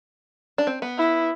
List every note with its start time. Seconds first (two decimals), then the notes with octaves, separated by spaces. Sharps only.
0.58 D4
0.67 C4
0.82 B3
0.97 E4